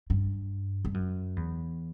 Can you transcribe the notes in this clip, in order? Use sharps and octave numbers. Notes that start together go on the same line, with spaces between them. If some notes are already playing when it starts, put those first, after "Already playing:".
G2
G2
F#2
E2